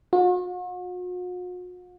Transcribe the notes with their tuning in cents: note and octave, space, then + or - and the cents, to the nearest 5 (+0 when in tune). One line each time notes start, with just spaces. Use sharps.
F#4 -45